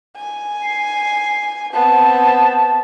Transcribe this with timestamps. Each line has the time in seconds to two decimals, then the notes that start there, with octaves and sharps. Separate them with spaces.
0.17 G#5
0.63 C7
1.73 B3 C4 A5